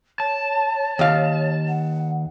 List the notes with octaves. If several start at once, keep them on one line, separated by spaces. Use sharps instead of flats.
C#5 A5
D#2 F5
F#5